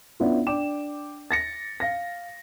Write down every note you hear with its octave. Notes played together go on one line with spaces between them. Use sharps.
B3 C#4 D4 E4 F4
D4 G5 D6 E7
A6 A#6 C#7
F5 A#6